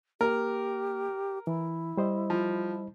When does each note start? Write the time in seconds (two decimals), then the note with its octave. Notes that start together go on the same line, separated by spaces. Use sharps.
0.21 A#3 G4 A#4
1.47 E3 E4
1.97 G3 C5 D#5
2.30 F3